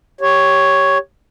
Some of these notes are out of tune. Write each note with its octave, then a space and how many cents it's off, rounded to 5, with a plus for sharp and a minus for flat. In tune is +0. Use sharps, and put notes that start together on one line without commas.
G4 +0 C#5 +0